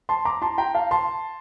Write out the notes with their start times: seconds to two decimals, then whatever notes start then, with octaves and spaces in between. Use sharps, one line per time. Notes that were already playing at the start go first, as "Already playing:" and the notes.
0.09 A5 C6
0.25 A#5 D6
0.42 A5 C6
0.58 G5 A#5
0.75 F5 A5
0.91 A5 C6